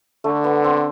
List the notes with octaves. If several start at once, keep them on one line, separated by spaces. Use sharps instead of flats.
D3 A3
B3
C4